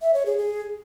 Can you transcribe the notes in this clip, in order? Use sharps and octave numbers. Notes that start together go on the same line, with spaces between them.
E5
C#5
G#4
G#4